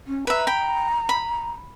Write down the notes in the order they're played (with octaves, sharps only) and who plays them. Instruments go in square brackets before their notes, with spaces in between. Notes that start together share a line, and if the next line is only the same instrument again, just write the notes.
[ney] C#4
[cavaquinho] B4 E5 [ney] A#5
[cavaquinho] G5 B5
B5